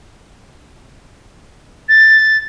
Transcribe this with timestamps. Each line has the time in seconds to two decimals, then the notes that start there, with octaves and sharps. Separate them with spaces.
1.89 A6